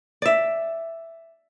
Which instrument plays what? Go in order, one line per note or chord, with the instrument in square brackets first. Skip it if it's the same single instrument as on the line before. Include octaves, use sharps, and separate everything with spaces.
[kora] D5 E5